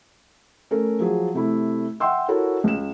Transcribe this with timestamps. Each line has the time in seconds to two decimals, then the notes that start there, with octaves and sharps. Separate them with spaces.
0.71 A3 C#4 A4 A#4
0.99 F3 F#3 G#4
1.34 C3 A3 E4
2.00 E5 F#5 G5 C6 E6
2.28 E4 F#4 A4 A#4 C#5
2.64 C#2 E7